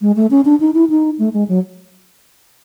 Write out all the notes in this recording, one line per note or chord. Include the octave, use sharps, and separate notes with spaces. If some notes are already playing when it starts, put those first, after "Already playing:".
G#3
A3
C#4
D4
D#4
E4
D#4
A3
G#3
F#3